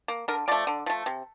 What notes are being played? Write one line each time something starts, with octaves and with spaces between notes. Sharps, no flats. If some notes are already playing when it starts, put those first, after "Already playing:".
A#3
D3 A#4
F3 A3 D5
D3
F3 A3
C3